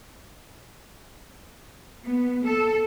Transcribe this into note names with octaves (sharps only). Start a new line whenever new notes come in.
B3
A4